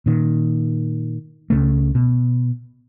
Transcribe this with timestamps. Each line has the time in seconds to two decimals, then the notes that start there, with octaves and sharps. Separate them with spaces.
0.06 A#2 D#3
1.50 C#2 C#3 A3
1.95 B2